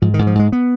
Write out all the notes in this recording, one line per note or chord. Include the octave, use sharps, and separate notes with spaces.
G#2 F3
D#3
G#2
F3
G#2 G#3
B3